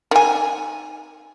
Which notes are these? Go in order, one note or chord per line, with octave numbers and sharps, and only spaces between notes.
D#3 G#5